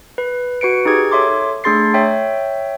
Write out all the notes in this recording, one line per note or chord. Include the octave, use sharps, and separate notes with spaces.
B4
F#4 B4 C#7 D7
D#4 G4 G#4 G#6
A4 C#5 E5 C6 D6
A3 D4 G#4 C6 A6 C7
C#5 E5 G5